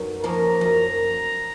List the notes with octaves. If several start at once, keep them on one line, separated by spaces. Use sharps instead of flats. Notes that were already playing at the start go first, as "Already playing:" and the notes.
Already playing: F#2 B3 D#4
F3 A#3 C#4 A#5
F#2